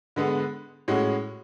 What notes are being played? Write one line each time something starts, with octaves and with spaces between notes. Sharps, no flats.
D3 G#3 B3
A2 G#3 C#4 F#4